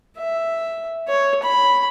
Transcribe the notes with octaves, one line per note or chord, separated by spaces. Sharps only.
E5
C#5
B5